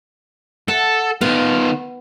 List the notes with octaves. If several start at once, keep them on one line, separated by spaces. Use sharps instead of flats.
A4 F#5
D#3 B3 F4